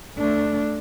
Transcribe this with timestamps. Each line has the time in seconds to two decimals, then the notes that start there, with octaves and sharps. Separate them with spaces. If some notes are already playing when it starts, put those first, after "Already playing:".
0.18 A3 D4